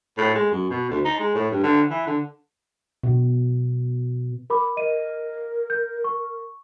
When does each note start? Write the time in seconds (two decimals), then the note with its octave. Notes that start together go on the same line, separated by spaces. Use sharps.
0.17 A2
0.35 G#3
0.51 F#2
0.70 B2
0.90 D2
1.05 D#4
1.20 G#3
1.35 A2
1.51 G2
1.63 D3
1.90 E3
2.07 D3
3.03 B2
4.50 A#4 B5 D6
4.77 A#4 D#5 D#7
5.70 G6
6.04 C#6